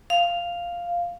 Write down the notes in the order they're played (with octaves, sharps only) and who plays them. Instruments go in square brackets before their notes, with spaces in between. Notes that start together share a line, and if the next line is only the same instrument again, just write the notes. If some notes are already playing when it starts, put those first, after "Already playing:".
[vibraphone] F5